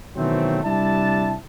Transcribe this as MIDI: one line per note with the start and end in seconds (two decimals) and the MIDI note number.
0.16 0.59 47
0.16 0.59 51
0.16 0.59 52
0.16 0.59 54
0.16 0.59 57
0.16 0.59 60
0.64 1.35 48
0.64 1.35 55
0.64 1.35 62
0.64 1.35 64
0.64 1.35 81